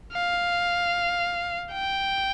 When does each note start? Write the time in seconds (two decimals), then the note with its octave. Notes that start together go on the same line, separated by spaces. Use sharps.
0.13 F5
1.72 G5